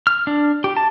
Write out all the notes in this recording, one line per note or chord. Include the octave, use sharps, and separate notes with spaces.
F6
D4
G4
A5